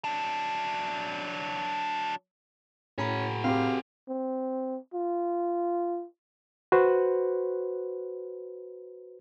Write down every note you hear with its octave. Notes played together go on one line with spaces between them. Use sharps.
F#3 D4
A2 C#4 F#4 G#4 A#5 B5
C4 G4 F5
C4
F4
F#4 B4 C5